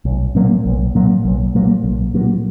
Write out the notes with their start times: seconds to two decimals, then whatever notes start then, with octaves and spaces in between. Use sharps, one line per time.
0.05 B1
0.35 A#2 F#3 A#3
0.66 B1
0.95 A#2 F#3 A#3
1.25 B1
1.55 A#2 F#3 A#3
1.84 B1
2.14 A#2 F#3 A#3